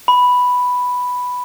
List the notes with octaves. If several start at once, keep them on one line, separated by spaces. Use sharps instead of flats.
B5